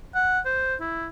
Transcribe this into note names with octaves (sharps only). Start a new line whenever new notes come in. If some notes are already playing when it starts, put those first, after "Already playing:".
F#5
C5
E4